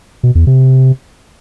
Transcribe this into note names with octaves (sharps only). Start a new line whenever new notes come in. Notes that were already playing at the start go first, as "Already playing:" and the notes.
B2
E2
C3